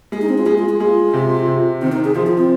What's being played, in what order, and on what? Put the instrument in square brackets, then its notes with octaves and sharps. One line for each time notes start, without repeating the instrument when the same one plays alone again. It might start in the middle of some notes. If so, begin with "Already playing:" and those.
[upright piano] G#3 [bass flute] G#4
[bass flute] D#4
C4
F4
[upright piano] G#3 [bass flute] G#4
[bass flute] F4
G#4
[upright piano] G#3 [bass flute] F4
[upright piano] C3
C3
[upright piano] D#3 [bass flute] C4
[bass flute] D#4
G#4
[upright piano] F3 [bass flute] F4
[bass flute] F4
C4